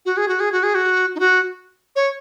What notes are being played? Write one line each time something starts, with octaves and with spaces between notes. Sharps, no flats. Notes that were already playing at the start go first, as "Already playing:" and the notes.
F#4
G#4
F#4
G#4
F#4
G#4
F#4
D#4
F#4
C#5